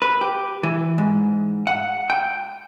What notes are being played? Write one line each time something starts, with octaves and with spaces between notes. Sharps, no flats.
B4
G4
E3
G#2
F#5
G5